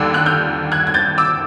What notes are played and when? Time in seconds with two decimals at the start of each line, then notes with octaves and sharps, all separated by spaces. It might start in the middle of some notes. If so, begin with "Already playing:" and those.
Already playing: D#2 D3 G3 E6 F#6
0.14 F#6
0.26 F6 G6
0.72 F#6 G#6
0.87 G#6
0.94 G6 A6
1.18 D6 E6